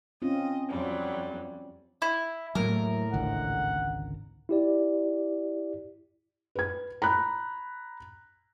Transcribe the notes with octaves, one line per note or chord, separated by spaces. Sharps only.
C4 C#4 F4 D#5
F2 F#3 G3
E4
E2 A2 F#3 A#3 A#4
G#1 C#2 D3 F#5
E4 G4 D5
B4 G#6
A#5 B5 F#6